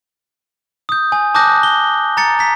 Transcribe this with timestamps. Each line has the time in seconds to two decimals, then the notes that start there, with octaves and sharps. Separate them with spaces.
0.89 D#6 G6
1.12 G#5
1.35 A5 D6 D#6 F#6 G6 A#6
1.63 G7
2.17 A#5 A6 C#7
2.39 A#5 B6